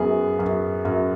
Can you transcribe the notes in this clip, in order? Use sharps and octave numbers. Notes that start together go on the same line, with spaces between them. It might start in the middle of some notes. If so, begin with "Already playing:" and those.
Already playing: F#2 B3 G#4
F#2
F#2